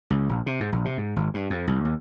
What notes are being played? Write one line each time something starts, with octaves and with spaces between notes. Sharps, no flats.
C#2
A#1
C3
G#2
A#1
C3
G#2
G#1
G2
F2
C2
D#2